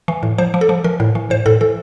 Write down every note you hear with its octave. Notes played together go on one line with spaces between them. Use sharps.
E3
A2
F3 C5
F3
A4
F3
E3 A#4
A2
E3
A2 C5
A2 A4
E3 A4